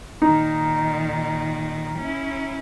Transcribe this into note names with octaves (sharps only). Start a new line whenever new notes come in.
A#2 D#3 D#4
C#4 E4